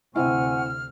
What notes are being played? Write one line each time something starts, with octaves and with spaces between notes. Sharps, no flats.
D2 C3 C4 E4 F#5 G#5 C#6 F6